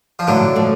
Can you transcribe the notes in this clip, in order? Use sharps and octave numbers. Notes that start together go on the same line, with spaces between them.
F3
A2 D3 F#3
F3 A3